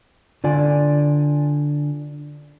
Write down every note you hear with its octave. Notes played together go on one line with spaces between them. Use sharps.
D3 F4 D5 G#5